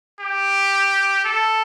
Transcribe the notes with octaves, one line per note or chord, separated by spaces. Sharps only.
G4
A4